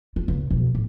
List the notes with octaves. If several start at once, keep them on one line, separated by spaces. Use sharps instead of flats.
F4
C#2
B1 F2
A2